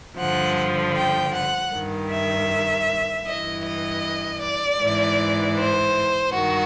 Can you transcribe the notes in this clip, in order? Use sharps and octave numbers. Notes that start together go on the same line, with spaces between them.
G2 D3 F3 F#5
G5
F#5
G2 D#3
E5
G2 E3 D#5
D#5
D5
G#2 E3
C5
G2 D#3 F#4